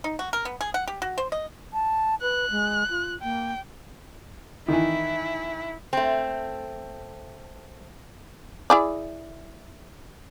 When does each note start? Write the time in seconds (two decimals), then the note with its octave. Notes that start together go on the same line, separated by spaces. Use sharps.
0.04 D#4
0.19 F#4
0.33 A#4
0.45 B3
0.61 G#4
0.74 F#5
0.88 G4
1.02 F#4
1.18 C5
1.32 D#5
1.73 A5
2.22 B4 F#6
2.51 G#3
2.90 F4
3.23 A#3 G5
4.68 D#3 E3 E4
5.93 A3 C4
8.70 E4 G#4 D5